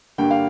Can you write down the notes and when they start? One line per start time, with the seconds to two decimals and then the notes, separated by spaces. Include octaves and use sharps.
0.18 G2 D3 G3 A#3 G5
0.31 F5